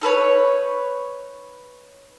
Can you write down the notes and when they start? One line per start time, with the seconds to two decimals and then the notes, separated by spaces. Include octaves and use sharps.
0.01 D#4 A4 B4 C#5